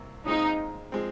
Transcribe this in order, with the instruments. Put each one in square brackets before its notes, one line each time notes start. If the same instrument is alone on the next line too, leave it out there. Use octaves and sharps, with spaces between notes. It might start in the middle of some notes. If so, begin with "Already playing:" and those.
Already playing: [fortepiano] C2 C3 A#3
[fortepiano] A#2 G#3 C4 F4 [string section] D#4
[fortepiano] F3 G#3 C4